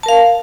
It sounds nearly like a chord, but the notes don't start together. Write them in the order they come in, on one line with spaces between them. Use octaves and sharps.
A5 A#4 F5